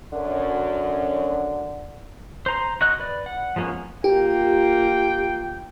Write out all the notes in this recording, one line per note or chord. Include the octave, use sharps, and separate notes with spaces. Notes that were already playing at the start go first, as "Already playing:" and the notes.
F#2 D3
C5 A#5 C6
F#4 D#5 F#6
B4 D5
F#5
F3 G#3 A#3 B3 C#4
A#3 F4 G4 G5